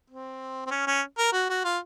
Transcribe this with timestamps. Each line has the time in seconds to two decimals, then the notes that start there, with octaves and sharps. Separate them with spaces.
0.10 C4
0.66 C4
0.71 C#4
0.87 C#4
1.18 A#4
1.33 F#4
1.49 F#4
1.64 F4